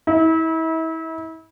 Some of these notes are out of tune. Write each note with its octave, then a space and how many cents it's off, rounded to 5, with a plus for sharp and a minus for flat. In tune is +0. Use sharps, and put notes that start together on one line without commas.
E4 -35